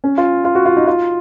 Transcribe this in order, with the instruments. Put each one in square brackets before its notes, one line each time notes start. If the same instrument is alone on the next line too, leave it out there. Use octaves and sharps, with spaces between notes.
[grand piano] C#4
F4
F4
F#4
F4
D#4
F4